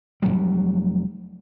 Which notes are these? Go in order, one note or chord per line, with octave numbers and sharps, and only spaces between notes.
F1 F#2 F#3 G3